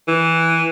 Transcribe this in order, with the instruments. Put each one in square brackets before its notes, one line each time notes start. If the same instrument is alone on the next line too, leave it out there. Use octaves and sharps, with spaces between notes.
[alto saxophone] E3